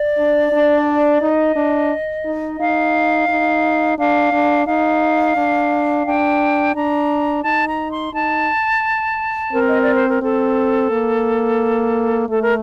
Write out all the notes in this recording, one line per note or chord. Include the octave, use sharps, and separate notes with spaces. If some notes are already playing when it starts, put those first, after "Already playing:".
Already playing: D5
D4
D4
D#4 D#5
D4
D#4
D#4 F5
D#4
D4 F5
D4
D#4 F5
D4
D4 G5
D4 A#5
D#4 A5
A#5
C6
D#4 A5
C4 A#4
D#5
D5
C5
A#4
C4 A4
A#3
A3 A4
A#4